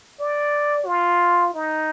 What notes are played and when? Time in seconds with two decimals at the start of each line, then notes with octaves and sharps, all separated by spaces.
0.20 D5
0.86 F4
1.54 D#4